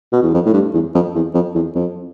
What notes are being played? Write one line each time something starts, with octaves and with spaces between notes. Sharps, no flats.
B2
E2
F2
A2
G2
E2
F2
E2
F2
E2
F2